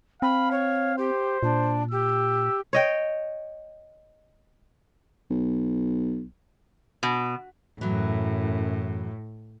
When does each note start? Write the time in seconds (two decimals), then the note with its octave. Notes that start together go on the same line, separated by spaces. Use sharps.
0.22 C4 F5 B5
0.51 C#5
0.98 G4 C5
1.43 A#2 D4
1.91 G4 E6
2.73 C#5 D#5 G5
5.31 B1
7.03 B2
7.81 F#2 A2 E3 F#3